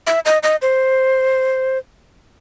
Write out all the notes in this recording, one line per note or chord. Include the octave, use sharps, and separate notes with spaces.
E5
D#5
D#5
C5